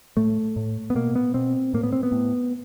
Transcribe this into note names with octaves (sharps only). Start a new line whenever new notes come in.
A2 A3
A2
B3
B2 A#3
B3
B2 C4
A2 A#3
B3
C4
B3
A2